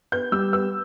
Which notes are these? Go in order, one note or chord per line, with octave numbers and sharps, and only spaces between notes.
B3 G6
G3 E6
B3 E6